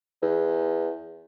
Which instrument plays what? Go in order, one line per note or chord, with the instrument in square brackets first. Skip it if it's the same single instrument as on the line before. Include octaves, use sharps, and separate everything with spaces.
[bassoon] E2